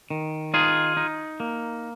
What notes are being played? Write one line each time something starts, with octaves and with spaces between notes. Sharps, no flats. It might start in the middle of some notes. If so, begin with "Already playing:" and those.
D#3
D#4 F4 G#4
D#4
A#3